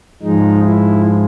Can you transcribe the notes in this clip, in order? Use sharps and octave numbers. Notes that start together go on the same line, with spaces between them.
G#2 F3 G#3 D#4
E4